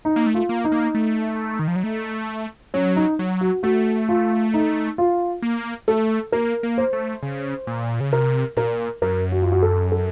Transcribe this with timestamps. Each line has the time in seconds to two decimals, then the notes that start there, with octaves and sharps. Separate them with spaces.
0.05 D#4
0.16 A#3
0.26 A3
0.34 F4
0.49 A#3
0.64 D#4
0.72 A#3
0.95 A3
1.59 D#3
1.68 F3
1.76 F#3
1.84 A3
2.74 F#3 C#4
2.96 D#4
3.19 F#3
3.41 F#4
3.63 A3 F#4
4.09 F4
4.54 D#4
4.98 F4
5.42 A#3
5.88 A3 A4
6.32 A#3 A#4
6.63 A#3
6.78 C5
6.93 A3
7.23 C#3
7.67 A#2
8.00 C#3
8.12 C3 A#4
8.57 A#2 A#4
9.02 F#2 A#4
9.32 F#4
9.42 F4
9.52 F#4
9.62 A4
9.92 A4